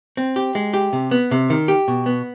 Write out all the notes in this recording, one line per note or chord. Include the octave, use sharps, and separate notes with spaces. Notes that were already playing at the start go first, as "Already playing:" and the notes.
C4
G4
G#3
G4
C3
B3
C3
D#3
G4
B2
B3